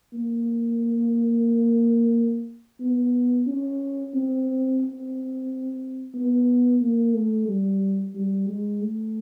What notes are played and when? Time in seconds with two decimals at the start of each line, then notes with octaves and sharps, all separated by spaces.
0.13 A#3
2.80 B3
3.47 C#4
4.14 C4
4.81 C4
6.14 B3
6.81 A#3
7.14 A3
7.48 G3
8.15 G3
8.48 G#3
8.82 A3